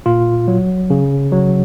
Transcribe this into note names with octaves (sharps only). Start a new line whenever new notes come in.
A#2 F4
F#3
C#3
F#3